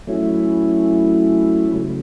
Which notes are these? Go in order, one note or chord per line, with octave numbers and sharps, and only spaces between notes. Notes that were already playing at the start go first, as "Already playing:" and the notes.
F#3 A3 C#4 E4
C#3 F#3 A3